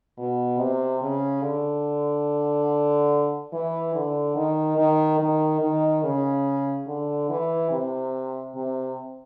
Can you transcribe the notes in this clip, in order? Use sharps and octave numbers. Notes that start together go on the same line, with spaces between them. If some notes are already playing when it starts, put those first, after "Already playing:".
B2
C3
C#3
D3
E3
D3
D#3
D#3
D#3
D#3
C#3
D3
E3
C3
C3